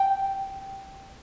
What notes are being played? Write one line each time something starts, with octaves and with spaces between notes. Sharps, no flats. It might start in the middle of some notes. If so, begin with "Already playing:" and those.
Already playing: G5